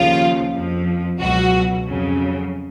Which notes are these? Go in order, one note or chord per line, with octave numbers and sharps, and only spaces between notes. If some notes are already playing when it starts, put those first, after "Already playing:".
Already playing: D#2 C#3 F3 F4
F2 F3
C#2 B2 F#3 F#4
F2 C#3 F#3